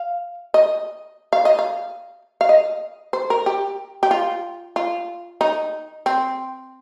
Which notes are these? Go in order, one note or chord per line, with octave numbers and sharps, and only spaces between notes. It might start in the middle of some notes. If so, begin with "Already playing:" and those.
Already playing: F5
D#5
F5
D#5
F5
F5
D#5
C5
A#4
G4
G4
F4
F4
D#4
C4